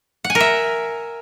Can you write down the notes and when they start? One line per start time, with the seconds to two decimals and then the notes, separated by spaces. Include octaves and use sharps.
0.24 F#5
0.30 G#5
0.35 A#4
0.40 E5